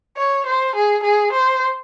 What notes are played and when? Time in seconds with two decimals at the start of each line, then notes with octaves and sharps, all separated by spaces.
0.17 C#5
0.46 C5
0.75 G#4
1.03 G#4
1.33 C5